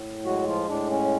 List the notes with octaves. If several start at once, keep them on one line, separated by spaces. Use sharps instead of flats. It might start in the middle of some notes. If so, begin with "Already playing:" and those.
Already playing: A2
F#3 G#3 F#4
F3 F4
A2 D4
C#4